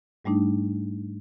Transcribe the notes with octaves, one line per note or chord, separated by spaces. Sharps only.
G#2 G3 A3 D4 D#4